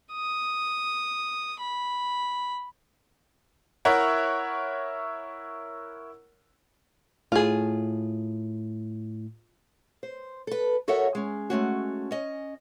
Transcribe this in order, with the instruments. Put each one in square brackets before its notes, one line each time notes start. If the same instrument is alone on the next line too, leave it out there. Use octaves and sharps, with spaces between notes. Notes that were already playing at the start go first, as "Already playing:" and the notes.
[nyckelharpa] D#6
B5
[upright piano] E4 A#4 C#5 E5 F#5
[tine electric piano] A2 [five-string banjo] F4 G#4
[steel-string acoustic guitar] C5
A4 B4
F#4 A4 A#4 C#5 E5 F#5
G#3 C#4
G#3 A3 C#4 F#4
C#4 D#5